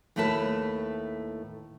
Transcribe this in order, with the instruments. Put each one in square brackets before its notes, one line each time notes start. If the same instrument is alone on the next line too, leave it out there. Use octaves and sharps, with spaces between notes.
[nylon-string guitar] D#2 A2 A3 E4 B4 A5